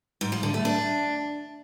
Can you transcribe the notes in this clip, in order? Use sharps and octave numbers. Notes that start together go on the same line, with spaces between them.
G#2
F3
D3
A3
D4